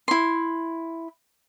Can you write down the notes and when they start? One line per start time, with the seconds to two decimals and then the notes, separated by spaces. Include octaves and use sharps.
0.08 E4 C6